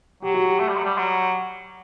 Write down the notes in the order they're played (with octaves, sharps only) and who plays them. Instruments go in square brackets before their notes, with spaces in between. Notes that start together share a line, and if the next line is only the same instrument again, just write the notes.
[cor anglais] F#3 [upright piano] G4
[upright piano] F#4
G4
[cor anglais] A3
G3
F#3
G3
F#3